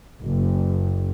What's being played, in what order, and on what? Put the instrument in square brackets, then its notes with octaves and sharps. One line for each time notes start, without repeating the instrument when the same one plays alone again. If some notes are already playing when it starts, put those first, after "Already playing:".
[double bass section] F#1